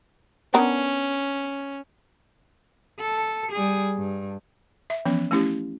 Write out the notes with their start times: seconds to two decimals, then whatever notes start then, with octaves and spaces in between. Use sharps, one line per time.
0.54 B3 C#4 D4 A#4
3.01 A4
3.52 G3 G#4
3.97 G2
4.90 E5
5.05 E3 F3 B3 C#4
5.31 A3 C#4 E4 G4